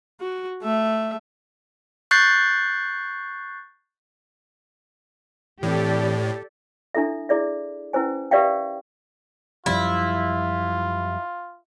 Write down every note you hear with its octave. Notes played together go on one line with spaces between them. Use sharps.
F#4
A3 E5
C#6 F#6 G6 A6 C7
A2 E3 C4 G4 A4 D5
D4 E4 A4 E5
E4 G#4 D5 E5
C#4 E4 B4 C5 G#5
G4 B4 D5 E5 F5 G5
F#2 F3 G3 E4 F4